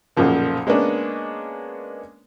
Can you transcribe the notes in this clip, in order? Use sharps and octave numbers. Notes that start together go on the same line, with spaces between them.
B1 F#2 A#2 C#3 F3 A#3
G#3 A#3 B3 C#4 D4